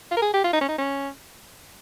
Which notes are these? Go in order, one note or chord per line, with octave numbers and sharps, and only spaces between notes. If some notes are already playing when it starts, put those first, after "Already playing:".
F4
A#4
G#4
G4
F4
D#4
C#4
D#4
C#4